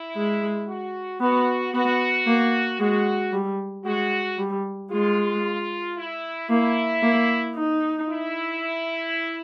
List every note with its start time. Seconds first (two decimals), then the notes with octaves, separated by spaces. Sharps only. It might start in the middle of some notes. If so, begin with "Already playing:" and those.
Already playing: E4
0.15 G#3
0.68 F#4
1.20 B3 F#4
1.73 B3 F#4
2.27 A#3
2.80 G#3 F#4
3.33 G3
3.85 G#3 F#4
4.38 G3
4.91 G#3 F4
5.97 E4
6.50 A#3 E4
7.03 A#3
7.56 D#4
8.10 E4